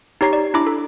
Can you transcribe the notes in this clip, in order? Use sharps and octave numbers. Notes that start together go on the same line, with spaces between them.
D#4 G4 C#5 A#5 C7
D5
D4 E4 A#5 B5 D6
A4